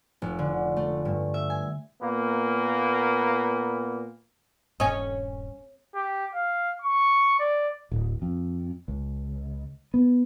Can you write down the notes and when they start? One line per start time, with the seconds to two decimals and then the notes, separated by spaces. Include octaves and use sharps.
0.22 F1
0.39 D3
0.76 A3
1.05 G2
1.34 E5
1.50 G#5
2.02 A#2 A#3 B3
4.80 D#1 G2 C#4 D#5 G#5
5.95 G4
6.35 F5
6.82 C#6
7.40 D5
7.92 D1
8.22 F2
8.88 C#2
9.94 B3